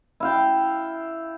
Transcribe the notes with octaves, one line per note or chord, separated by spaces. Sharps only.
E4 F5 G5